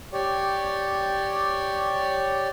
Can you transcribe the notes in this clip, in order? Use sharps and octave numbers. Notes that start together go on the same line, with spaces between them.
G4 C#5 D5